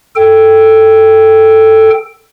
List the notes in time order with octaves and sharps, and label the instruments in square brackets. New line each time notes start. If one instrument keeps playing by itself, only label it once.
[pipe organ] A4 G5